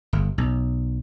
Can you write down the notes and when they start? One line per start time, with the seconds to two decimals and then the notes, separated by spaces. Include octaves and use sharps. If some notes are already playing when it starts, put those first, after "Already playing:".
0.13 G1
0.38 B1